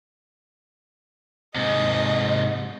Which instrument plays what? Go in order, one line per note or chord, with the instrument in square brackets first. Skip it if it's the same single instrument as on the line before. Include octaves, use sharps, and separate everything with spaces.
[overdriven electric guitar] G#2 C3 [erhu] D#5